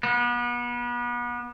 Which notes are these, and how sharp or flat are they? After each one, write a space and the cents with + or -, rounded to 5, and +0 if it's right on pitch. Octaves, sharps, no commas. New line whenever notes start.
B3 -35